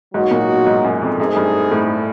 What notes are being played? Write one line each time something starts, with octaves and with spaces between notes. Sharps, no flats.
G#2 F#3 A#3 D#4 F#4
A#2
B2
G#2
F#2
F2
F#2 A3 C4 D#4 G#4
G2
A2